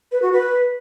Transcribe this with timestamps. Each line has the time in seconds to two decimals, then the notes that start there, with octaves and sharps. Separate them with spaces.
0.12 B4
0.22 F#4
0.32 B4